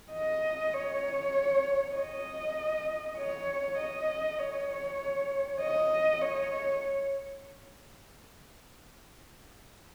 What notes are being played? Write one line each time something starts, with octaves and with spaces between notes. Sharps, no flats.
D#5
C#5
D#5
C#5
D#5
C#5
D#5
C#5